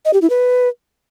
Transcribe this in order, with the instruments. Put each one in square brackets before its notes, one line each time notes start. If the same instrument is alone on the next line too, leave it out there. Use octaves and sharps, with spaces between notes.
[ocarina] D#5
G4
E4
B4